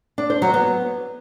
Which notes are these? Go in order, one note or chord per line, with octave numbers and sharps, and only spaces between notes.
D4
C5
F#3
B3